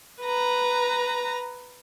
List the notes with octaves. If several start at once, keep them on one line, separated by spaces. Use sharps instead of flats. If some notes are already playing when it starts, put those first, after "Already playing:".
B4 A#5